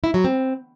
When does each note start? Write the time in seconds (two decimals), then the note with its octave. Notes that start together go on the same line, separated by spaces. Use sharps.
0.04 E4
0.14 F#3
0.25 C4